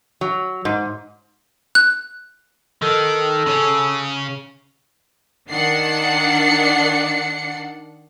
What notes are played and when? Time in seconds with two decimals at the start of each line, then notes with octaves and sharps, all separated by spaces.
0.21 F#3
0.65 G#2
1.75 F#6
2.82 D#3 A4
3.46 C#3 C#4
5.50 D#3 D4 F#5 C7 C#7